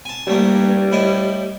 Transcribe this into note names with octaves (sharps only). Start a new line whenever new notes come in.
G#5 A5
G2 G3 A3 A#3
A2 E4 D#5